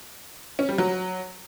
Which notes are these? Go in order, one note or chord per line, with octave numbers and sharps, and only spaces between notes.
C#4
G3
F#3